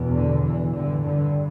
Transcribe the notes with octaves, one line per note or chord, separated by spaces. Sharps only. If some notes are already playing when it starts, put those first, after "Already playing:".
Already playing: E2 B2
D3
E3
G2 D3
D3